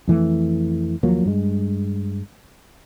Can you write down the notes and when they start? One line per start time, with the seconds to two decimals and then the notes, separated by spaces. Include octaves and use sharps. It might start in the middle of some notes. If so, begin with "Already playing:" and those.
0.08 F2 E3 A3
1.03 D#2 F3 F#3 A#3
1.25 G2 G#3